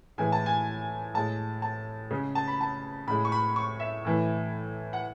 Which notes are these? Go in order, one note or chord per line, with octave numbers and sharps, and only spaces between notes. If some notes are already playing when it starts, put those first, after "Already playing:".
A2 E3 G#3 G#5
A5
G#5
A2 G#3 A5
A5
C#3 G#3
A5
B5
A5
A2 G#3 B5
C#6
B5
C#6
E5
A2 E3 A3
F#5